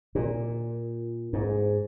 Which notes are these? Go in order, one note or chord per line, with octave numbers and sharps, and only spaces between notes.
A#2
G#2